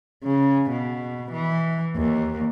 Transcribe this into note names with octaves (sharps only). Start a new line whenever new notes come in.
C#3
B2
E3
D#2